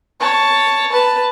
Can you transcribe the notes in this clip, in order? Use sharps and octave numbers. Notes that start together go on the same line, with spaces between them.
C#5 A5
B4 A5